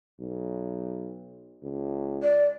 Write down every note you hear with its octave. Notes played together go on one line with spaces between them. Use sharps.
B1
C#2
D5